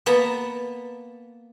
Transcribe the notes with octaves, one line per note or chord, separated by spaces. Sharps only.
A#3 B3 A5 A#5